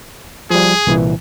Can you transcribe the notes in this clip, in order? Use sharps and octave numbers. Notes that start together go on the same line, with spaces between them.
F3 G3 G#4
C2 A#2 E3